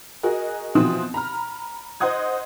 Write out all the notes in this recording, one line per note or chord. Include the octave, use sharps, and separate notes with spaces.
F#4 G#4 A#4 D#5
B2 E3 F3 C4 F#4 D#6
A#5 B5 F6
C5 D#5 F#5 D#6 G#6